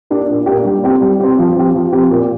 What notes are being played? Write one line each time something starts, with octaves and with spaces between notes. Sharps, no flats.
A#3 D4 G4
A#2
A#3 D4 G4
G3
C4 G4
G3
C4 G4
F3
C4 G4
F3
C4 G4
A#2